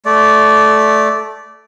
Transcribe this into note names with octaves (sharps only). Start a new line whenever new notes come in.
A3 D5